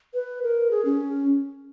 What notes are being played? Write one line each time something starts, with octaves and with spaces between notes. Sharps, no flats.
B4
A#4
G#4
C#4